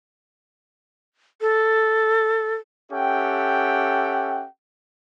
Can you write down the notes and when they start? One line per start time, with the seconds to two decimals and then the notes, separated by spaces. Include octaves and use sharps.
1.41 A4
2.92 C#4 G4 A4 E5 F#5 G5